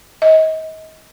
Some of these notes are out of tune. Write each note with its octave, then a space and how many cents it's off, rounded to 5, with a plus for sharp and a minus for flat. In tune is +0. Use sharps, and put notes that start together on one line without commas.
D#5 +35